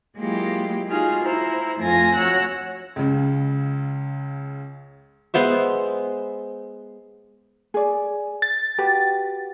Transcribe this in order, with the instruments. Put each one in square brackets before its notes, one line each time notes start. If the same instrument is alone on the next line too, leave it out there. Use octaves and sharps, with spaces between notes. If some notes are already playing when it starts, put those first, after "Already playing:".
[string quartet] F#3 G#3 A#3 E4 F4 G4
D#4 F4 F#4 G#4 F6
E4 C5 A#5
F2 A3 F4 G#5 A#6
F#4 C#5 F#5 A#5 E6 F#6
[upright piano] C#2 C#3
[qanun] G#3 B3 C5 E5
[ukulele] G#4 D5
[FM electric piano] A6
[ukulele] F#4 G4 B4